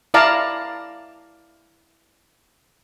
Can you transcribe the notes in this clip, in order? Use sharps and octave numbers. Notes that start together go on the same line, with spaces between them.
E4 D5 F5 A5 A#5